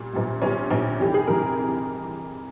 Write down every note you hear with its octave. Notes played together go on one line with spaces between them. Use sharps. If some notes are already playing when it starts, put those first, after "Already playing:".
Already playing: A#2 G3
A#1 A#2 G3
A#1 A#2 G3 C#4
A#1 A#2 G3
F1 F2 E3 G3 G4
G#4
F1 F2 E3 G3 A#4